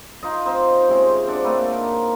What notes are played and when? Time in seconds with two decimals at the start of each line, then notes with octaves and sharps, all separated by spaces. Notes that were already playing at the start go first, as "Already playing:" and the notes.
0.23 D#4 F4 D#5
0.45 C4 D#4 C5
0.88 C3 G#3 C4 C#4
1.27 C4 D4 D5 F#5
1.44 A3 A#3 C4 B4
1.71 D#4 A#4